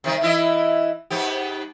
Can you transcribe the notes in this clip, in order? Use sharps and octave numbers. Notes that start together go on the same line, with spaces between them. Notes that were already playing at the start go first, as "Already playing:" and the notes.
C3 D#3 G3
E3 E4 D#5
G#2 B3 G4